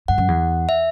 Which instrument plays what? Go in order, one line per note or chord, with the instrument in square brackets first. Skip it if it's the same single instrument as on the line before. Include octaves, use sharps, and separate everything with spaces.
[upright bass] G2 [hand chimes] F#5
[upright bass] F#2
E2
[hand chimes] E5